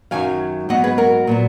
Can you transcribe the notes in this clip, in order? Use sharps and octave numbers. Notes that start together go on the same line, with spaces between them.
F#2 D#3 F#3 F5 G#5
G#2 F#3 B3 D#5 F#5
G#4 B4
F#4 A#4
A#2 F#3 B3